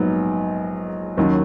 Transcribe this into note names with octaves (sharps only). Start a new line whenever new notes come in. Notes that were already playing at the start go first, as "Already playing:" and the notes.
Already playing: A#1 G#2 F#3 B3 D#4
D#2 D#3 F#3 C#4